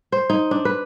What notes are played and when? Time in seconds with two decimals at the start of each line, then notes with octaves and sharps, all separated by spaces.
0.12 C5
0.30 D#4
0.51 D4
0.65 B4